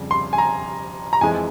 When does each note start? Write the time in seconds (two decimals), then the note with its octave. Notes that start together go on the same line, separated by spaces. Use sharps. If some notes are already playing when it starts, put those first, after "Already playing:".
Already playing: F2 C#3 G3
0.11 C6
0.33 G#5
0.38 A#5
1.13 A#5
1.21 F2 E3 G#3 G#5